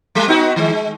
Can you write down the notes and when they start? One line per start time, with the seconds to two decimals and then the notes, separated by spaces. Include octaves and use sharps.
0.15 G3 A3
0.28 B3 D#4 F#4
0.56 D#3 G#3
0.73 G#3